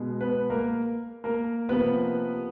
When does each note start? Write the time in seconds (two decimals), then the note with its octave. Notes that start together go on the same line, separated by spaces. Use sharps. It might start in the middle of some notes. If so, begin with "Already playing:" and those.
Already playing: B2 G#3
0.21 B3 B4
0.50 A#3 A#4
1.24 A#3 A#4
1.69 C3 F3 A#3 B3 B4